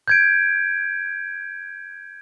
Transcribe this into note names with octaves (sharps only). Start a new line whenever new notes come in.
G6 G#6 D7